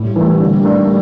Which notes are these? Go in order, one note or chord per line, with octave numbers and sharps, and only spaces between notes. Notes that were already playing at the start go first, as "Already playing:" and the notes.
Already playing: A2 G3
E3 A3
D3 A#3
A3 D4